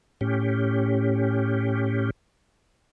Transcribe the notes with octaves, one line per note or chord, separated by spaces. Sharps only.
A2 C#4 G4